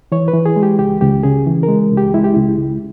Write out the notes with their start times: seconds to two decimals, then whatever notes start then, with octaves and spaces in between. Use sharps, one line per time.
0.12 E3 C#5
0.28 B4
0.34 E3
0.46 G#4
0.56 G#3
0.63 G4
0.79 C#2 G4
1.01 C#2 G4
1.23 C#3 G#4
1.47 E3
1.63 A#4
1.68 G#3
1.92 C#2
1.97 G4
2.14 G#3 E4
2.24 G4
2.34 C#2 E4
2.58 C#2